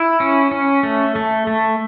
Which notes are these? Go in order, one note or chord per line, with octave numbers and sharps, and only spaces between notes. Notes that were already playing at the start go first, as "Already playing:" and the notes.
Already playing: E4
C#4
C#4
A3
A3
A3